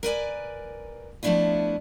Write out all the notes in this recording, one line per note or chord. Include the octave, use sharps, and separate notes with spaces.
A#4 B4 D5 G#5
F3 A3 B3 D4 E4 F4